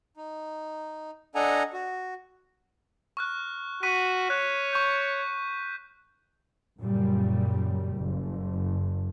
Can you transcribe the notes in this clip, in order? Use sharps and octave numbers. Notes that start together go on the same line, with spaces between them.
D#4
D4 A4 D#5 F#5 G#5 A#5
F#4
C#6 F6 F#6
F#4 C#6 B6 D#7
C#5 F#6
C#6 G6
F#2 A#2 C#3 G3
F#1